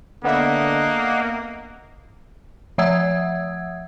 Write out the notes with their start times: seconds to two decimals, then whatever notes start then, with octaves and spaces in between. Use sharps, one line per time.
0.24 D3 A#3 B3 D#5 E5 F#5
2.78 F3 E5 F#5 D#6 E6 G#6